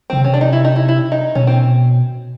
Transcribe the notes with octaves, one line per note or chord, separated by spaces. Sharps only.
C#3 C4
C3
C#4
D4
D#4
E4
D#4
E4
E4
D#4
B2 C#4
C4